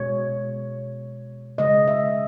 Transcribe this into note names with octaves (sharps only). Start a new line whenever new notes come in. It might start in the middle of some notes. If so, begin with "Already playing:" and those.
Already playing: B2 G#3 C#5
C#3 G#3 D#5
E5